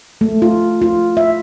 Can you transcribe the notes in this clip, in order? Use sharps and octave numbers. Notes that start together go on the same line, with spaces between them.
A3
F4
F4
E5